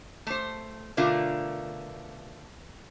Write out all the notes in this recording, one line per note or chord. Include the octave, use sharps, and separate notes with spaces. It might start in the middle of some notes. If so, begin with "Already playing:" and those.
A3 C5
B2 D3 A3 F4 A#4